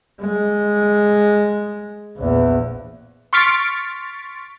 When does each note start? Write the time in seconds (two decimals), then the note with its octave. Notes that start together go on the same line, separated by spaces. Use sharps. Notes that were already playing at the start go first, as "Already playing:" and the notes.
0.21 G#3
2.17 A#1 E2
3.33 C6 C#6 F6 A6 B6 D7